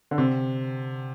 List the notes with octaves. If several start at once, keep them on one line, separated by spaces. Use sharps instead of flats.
D3
C3